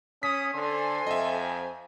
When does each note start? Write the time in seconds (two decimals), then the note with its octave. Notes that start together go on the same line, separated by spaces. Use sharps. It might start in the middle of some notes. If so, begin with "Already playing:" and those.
0.23 C#4 D#6 B6
0.54 D3 A4 C5 G#5 C6
1.07 F2 D#5 E5